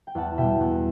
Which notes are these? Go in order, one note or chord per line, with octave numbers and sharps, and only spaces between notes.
G5
E2 F#5 A5
B2 G3 E5 G5
E2